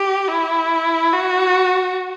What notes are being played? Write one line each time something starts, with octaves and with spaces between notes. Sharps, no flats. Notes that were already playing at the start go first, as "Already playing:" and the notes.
Already playing: G4
E4
F#4